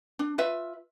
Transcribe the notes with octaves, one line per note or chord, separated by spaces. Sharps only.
D4
F4 B4 E5